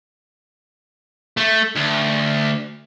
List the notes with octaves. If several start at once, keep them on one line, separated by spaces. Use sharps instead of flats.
A3
D2